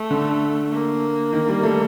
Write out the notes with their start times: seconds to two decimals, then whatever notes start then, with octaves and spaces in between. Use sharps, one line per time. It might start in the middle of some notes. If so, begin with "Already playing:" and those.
Already playing: A3
0.11 D3
0.72 A#3
1.33 D#3
1.49 G3
1.63 A3